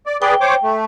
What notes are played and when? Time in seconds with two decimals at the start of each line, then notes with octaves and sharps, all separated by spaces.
0.06 D5
0.22 G#4 B4 D5 G5
0.41 C5 C#5 D6
0.63 A3